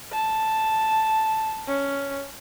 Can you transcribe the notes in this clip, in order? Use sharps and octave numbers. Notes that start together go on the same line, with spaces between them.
A5
C#4